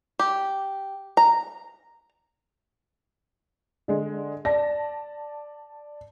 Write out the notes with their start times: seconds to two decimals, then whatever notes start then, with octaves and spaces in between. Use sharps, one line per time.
0.19 G4
1.17 A#5
3.88 D3 G#3
4.45 D5 A5 A#6